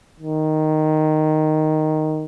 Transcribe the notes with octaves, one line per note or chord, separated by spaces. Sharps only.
D#3